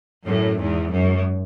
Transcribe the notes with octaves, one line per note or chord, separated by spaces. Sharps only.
F#2 A2
E2 G#2
F#2